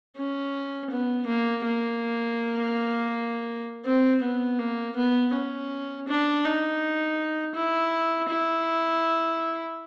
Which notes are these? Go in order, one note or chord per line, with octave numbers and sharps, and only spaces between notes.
C#4
B3
A#3
A#3
C4
B3
A#3
B3
C#4
D4
D#4
E4
E4